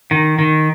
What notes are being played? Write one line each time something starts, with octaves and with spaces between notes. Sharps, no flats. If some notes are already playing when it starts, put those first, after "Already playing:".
D#3
D#3